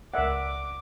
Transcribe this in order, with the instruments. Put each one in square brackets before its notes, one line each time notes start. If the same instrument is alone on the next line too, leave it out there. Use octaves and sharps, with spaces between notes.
[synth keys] C#2 A#4 D5 [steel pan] E5 F#5 [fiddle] D6